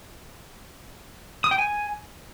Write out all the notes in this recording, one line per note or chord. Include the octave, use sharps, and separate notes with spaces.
D#6
G5
G#5